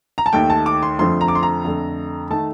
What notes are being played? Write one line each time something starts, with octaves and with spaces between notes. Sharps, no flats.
A#5
A5
D#2 D#3 A3 G5
A5
D6
C6
F2 D3 F3 A3 C6
A#5
D6
C6
A#5
F2 D3 A3
D#3 A3 A5